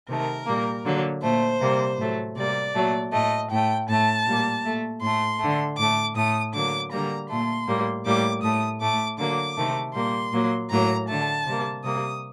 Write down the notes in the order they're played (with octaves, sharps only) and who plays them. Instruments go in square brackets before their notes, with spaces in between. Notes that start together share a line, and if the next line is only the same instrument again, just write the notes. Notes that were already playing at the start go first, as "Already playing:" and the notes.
[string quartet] C3 D#3 A3 A#4
A#2 G3 A#3
D3 F#3 A#3
A#2 A3 C5
C3 G3 A#3
A2 F#3 A3
C3 G3 A#3 D5
A#2 F#3 A3
A2 A3 D#5
A2 A3 G5
A2 A3 A5
A#2 G3 A#3
A#2 A3
A2 A3 C6
D3 A3
A2 A3 D6
A2 A3 D#6
D3 F#3 A#3 D6
D3 G3 A#3 A#5
A#2 A3 C6
A2 G3 A#3
A2 G3 A#3 D6
A2 A3 D#6
A2 A3 D6
D3 F#3 A#3 D6
C3 D#3 A3
A#2 G3 A#3 C6
A#2 F#3 A#3
A2 F#3 A#3 A#5
D3 A3 A5
C3 G3 A#3
C3 G3 A#3 D#6